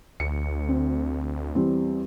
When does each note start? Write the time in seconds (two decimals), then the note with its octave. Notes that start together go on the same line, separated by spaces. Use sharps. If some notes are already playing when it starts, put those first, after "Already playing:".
0.20 D2 C#7
0.68 C4
1.55 E2 G3 C4